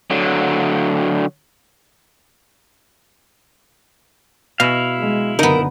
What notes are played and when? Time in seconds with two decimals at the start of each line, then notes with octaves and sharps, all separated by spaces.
0.10 D3 F#3
4.60 B2 E4 F5
4.98 G#3
5.39 F#1 D3 B3 D#4 A#4